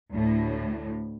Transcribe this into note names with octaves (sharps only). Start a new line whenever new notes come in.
D2 A2